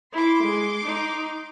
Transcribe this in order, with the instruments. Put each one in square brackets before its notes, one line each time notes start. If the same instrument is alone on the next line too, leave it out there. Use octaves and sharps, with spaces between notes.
[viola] E4 [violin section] C6 D6
[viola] G#3
D#4